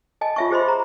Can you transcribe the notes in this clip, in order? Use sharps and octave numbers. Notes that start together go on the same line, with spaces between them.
D#5 G#5 A5
F4 C#5 E5 G#5 C#6
G4 G#4 C5 D#5 B5 C6
A#5